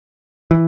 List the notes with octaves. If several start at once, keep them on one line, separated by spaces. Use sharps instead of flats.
E3